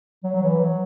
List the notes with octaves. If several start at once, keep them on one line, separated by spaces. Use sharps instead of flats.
F#3
F#3
E3
F#3